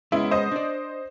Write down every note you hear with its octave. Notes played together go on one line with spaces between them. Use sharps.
G#3 B3 C#4 E4
C5 D#5
D4 D5